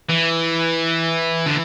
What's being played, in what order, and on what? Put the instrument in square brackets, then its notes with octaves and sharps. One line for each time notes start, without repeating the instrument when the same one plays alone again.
[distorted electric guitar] E3
D3